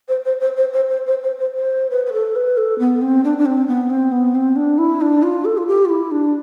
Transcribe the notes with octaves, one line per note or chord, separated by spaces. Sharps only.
C5
C5
C5
C5
C5
C5
C5
C5
C5
C5
B4
B4
A4
B4
A4
B3
C4
D4
D4
C4
B3
C4
B3
C4
D4
E4
D4
F4
A4
F4
G4
F4
E4
D4